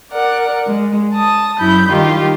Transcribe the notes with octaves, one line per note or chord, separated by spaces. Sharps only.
A#4 D5 F#5
G#3
A5 D#6
F#2 E4 B5 G6
D#3 G3 D#4 F4 G4